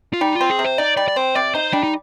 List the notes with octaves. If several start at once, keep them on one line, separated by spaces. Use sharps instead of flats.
F4
G3 D#4
F4
C4
G#4
C3
C5
D#4 D5
G3 D5
D5
C4 C5
C3 D5
D#4 C5
G3 D4
D#4